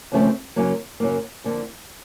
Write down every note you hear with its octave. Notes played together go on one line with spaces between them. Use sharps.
D#2 C#3 F3 A3 C4
F#2 C#3 F#3 A#3
F#2 C#3 F#3 A#3
F2 D3 F3 A#3